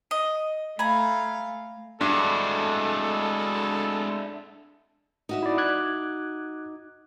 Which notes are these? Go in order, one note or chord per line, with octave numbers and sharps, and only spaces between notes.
D#5
A3 F5 G#5 A#5 B5
G2 G#3 D4 E4 F#4 A4
D#4 F#4 E5
E4 D5
D6 F#6 G#6